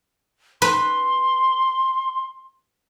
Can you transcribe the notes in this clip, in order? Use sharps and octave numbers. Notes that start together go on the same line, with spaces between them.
B4 C6